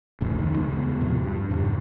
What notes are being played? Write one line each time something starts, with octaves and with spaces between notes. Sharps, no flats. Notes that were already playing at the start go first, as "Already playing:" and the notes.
A1 D2 A2 C#3
F2 D#3
D#2 C#3 G#3 B3
A2 C3 F3 F#3
G2
F2 G#2 C#3 G3